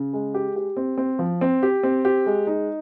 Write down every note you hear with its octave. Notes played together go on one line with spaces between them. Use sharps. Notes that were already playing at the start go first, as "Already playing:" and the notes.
Already playing: C#3
G#3
G4
G4
C4
C4
F3
C4
G4
C4
G4
G#3
D#4